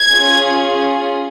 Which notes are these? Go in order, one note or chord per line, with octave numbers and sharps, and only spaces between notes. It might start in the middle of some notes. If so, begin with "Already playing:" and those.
Already playing: G#6
C#4 F4 G#4